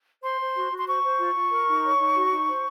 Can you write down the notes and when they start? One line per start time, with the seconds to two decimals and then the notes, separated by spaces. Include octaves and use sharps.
0.23 C5 C6
0.40 C5
0.55 F#4
0.71 F#4
0.78 C6
0.87 C5 C#6
1.03 C5
1.19 F4
1.36 F4
1.51 A#4
1.68 D#4
1.84 C#5
1.99 D#4
2.16 F#4
2.31 D#4
2.48 C5